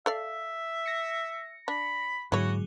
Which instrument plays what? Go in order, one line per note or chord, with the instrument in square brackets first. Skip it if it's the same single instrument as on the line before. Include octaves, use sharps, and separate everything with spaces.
[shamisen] A4 D5 F5 [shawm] E5
[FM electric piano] A#6 C#7
[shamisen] D4 [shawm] B5
[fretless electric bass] G#2 A#3 [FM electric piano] D3 F#3 G#4 [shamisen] E4 C#5 [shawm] F#4